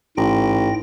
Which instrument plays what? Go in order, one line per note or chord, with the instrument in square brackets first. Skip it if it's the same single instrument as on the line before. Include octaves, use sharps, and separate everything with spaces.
[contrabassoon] A1 [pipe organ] G#2 G5 A#6